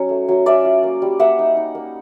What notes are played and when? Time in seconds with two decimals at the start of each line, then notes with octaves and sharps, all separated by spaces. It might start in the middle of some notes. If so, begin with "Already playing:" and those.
Already playing: F#3 C#4 D#4
0.09 A3
0.28 F#3
0.46 C#4 D5 E5
0.65 F4
0.83 A#3
1.02 G3
1.19 A#3 E5 F#5
1.39 D#4
1.57 D#4
1.75 A#3